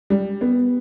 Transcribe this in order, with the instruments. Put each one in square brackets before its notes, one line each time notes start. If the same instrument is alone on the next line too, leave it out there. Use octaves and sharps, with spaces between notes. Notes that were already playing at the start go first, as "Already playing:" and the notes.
[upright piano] G3
B3